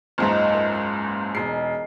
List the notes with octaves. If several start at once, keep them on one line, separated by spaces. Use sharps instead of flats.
F#1 C#2 G#2 C#4 D#4 F4
A#4 E5
F5
E1 D#4 G#4 C7